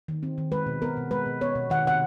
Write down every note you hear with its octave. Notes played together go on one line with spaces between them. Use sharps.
D#3
C4
D#3
G#3 B4
B2
B3 A#4
B2
G#3 B4
B2
B3 C#5
B2
D#3 F#5
C3 F#5